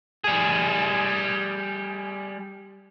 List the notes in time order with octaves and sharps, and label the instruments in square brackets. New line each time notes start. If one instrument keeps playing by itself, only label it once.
[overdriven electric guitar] G3 G#4